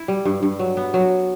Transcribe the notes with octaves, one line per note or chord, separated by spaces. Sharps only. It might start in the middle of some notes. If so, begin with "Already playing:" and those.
Already playing: E4
G3
G2
G2
F#3
B3
F#3